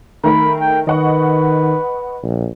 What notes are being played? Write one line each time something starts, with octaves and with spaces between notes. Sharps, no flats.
D#3 A3 A#4 B5
G5
D#3 B4 D#5 F#5 C#6
A#1